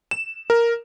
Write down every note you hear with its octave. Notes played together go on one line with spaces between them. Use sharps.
E7
A#4